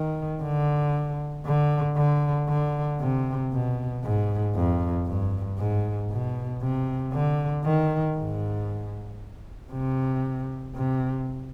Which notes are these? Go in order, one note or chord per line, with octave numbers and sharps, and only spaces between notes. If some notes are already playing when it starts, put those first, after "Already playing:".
Already playing: D#3
D3
D3
D3
D3
C3
B2
G#2
F2
G2
G#2
B2
C3
D3
D#3
G#2
C3
C3